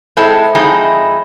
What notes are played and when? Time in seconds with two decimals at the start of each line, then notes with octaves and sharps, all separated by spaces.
0.17 G#3 C4 E4 A4
0.55 F2 G#3 C4 D#4 E4